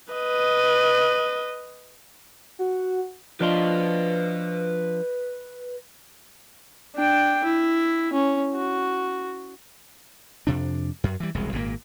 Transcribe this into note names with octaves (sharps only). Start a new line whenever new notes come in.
B4 D#5
F#4
F3 D4 F4 B4 D#5
D4 G5
E4
C#4
F#4
F2 C3 D4
F#2
E3 G3
E1 C2 G#3
G#1 A#2 A#3